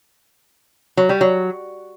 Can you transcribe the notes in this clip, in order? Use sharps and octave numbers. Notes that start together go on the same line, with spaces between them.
F#3
G3
F#3